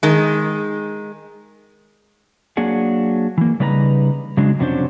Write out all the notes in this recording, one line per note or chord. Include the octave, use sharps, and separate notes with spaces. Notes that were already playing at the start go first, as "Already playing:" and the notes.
D#3 G#3
F#3 A#3 D4 G#4 F#5
E3 A#3
C#3 G3 D#4 B4 A5 A#5
C#3 F#3 G#3 D4
F2 C3 F#3 C#4 D4 C5